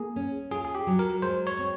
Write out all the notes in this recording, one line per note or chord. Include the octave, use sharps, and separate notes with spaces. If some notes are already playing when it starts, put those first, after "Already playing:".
Already playing: A#3 G#4
C#4
F4 G#4
G#4
G4
F#3
A#4
G#3 C5
C#5
C4